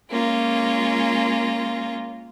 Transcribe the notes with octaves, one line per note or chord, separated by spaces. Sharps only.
G#3 A#3 C#4 F4